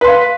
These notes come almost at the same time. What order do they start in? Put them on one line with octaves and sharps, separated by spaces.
B4 C6 F5